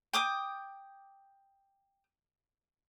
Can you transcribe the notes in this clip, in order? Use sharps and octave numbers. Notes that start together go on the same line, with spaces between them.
G5 D6 D#6